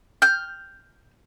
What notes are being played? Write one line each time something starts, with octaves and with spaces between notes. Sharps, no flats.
F6 G6